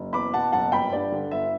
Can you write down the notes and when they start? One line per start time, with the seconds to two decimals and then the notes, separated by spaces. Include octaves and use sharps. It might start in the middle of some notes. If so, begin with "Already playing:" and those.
Already playing: F#1
0.13 E2 B5 D6
0.33 B2 F#5 A5
0.52 F#1 F#5 A5
0.72 G1 G5 B5
0.92 G2 D5
1.12 D3
1.31 G1 E5